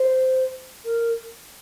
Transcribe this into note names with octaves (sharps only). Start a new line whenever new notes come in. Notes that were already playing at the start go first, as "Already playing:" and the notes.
Already playing: C5
A#4